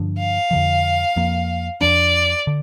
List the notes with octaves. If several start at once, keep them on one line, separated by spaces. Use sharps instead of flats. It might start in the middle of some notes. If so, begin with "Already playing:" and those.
Already playing: G2 D3 F3 D4
F5
F2 D3 F3
F2 F3 A#3
F2 F3 D4 D5
D3